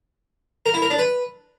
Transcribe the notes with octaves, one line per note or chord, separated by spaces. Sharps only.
A#4
E4
A#4
D4
B4